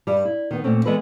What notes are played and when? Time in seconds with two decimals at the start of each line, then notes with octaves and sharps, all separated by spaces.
0.07 G2 G3
0.25 E4
0.51 D#3 B3
0.64 A#2 A3 C4 C#4
0.85 E3 G#3 B3 A4 B4